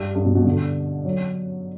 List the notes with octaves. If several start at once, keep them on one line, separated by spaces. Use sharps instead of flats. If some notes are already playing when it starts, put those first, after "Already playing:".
Already playing: G2
G2
B2
B2
D3
F#3